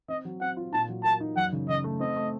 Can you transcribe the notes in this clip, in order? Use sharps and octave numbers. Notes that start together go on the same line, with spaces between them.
C4 D#5
F#3
C4 F#5
F4
A#2 A5
F#3
A#3 A5
D#4
F#2 F#5
C#3
C#3 D#5
A3
C4 D#5
A3